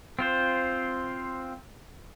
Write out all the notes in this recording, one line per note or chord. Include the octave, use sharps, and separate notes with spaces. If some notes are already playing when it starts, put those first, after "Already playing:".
C4 F4 C5